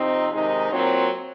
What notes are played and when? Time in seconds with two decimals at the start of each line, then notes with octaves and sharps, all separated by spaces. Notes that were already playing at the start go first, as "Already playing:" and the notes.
Already playing: C3 F3 C4 D#4
0.31 C3 D#3 G#3 D#4
0.70 A#2 F#3 C4